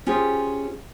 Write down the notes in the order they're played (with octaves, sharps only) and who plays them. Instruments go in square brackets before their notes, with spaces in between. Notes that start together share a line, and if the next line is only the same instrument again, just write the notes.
[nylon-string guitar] C#4 F4 G4 G#4 C5